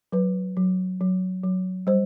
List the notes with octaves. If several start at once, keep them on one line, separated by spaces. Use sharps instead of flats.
F#3 B4
F#3
F#3
F#3
G3 C5